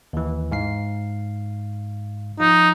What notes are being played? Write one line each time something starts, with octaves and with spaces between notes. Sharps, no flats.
D#2 E3
G#2 F5 C7
F3 D#4 F4